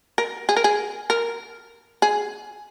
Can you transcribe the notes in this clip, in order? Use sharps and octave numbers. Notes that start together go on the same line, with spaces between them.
A#4
G#4
A#4
G#4
A#4
G#4